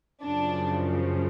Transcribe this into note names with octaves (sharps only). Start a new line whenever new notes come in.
F#2 C#3 F3 D4